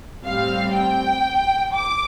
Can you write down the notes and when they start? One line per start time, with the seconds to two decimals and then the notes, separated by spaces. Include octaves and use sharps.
0.24 A2 G3 C4 F5
0.73 G5
1.74 D6